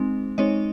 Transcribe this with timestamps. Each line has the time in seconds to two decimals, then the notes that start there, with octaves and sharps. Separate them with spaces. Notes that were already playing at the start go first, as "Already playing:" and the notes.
Already playing: G#3 C4 D#4
0.38 G#3 C4 D#4 C#5 D#5